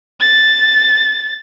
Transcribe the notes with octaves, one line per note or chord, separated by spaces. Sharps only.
A6